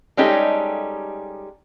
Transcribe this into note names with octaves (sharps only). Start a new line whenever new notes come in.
G3 G#3 C#4 D#4 G4 A4